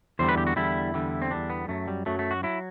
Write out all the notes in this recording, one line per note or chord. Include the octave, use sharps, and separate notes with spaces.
E2 D3 G3 C5
B4
G4
F#4
E2 D3 G3 E4
E2 D3 G3
C4
E2 D3 G3 D4
B3
F#2 F#3 A3
G3
F#2 F#3 A3
A3
F#4
F#3 E4